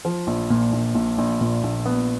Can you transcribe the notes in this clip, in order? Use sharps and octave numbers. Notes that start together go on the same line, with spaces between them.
F3
A#1
A#2
A#1
A#1
A#1
A#2
A#1
B3